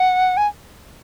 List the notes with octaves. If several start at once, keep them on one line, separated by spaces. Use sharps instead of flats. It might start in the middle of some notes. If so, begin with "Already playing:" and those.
Already playing: F#5
G#5